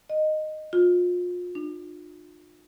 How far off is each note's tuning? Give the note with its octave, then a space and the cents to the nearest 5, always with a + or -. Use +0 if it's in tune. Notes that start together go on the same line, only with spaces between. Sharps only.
D#5 -10
F4 +35
D#4 -45